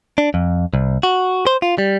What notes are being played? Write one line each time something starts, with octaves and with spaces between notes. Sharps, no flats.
D4
F2
C2
F#4
C5
F4
G3